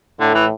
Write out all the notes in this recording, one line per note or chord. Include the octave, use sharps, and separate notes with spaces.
A2 D3
E3